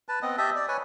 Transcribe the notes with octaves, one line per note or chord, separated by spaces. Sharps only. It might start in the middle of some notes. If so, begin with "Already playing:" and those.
B4 A5
B3 C4 D#5
G4 D#5 E5 A5
D5
B4 C#5 G#5